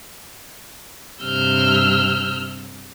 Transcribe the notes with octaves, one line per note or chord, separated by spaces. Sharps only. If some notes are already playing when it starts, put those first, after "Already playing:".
G2 C3 E6 F6 G6